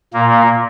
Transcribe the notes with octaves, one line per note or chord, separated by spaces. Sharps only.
A#2 A#3